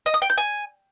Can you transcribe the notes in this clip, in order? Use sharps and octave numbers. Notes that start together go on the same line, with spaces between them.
D#5
D#6
G5
G6
G#5